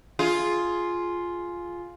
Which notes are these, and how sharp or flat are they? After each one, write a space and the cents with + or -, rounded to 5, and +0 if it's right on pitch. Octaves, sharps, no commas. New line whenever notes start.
F4 +0 G#4 +15